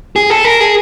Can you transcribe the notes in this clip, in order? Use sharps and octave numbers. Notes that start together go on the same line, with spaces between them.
G#4
A4
A#4
G#4